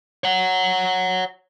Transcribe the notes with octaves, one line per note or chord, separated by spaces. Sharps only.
C#5 F#5